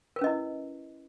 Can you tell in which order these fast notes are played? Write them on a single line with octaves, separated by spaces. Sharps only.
A#4 B4 C#4 D#5 E4